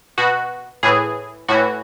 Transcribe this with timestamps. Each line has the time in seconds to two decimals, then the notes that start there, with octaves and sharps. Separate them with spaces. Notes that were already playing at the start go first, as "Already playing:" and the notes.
0.18 B2 F#4
0.83 A2 E3 G#4
1.48 A2 E3 F#4